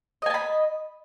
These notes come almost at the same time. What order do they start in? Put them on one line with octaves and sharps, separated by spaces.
D#5 G#5 A5 B5